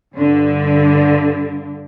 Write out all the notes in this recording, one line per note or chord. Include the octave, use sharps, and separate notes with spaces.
G2 D3